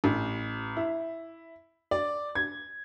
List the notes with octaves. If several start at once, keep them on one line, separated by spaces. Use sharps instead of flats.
A1
E4
D5
G#6